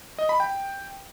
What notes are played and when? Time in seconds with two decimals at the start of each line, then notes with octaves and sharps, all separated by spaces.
0.19 D#5
0.29 B5
0.40 G5